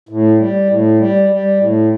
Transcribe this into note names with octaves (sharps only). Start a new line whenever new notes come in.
A2
G3
A2
G3
G3
A2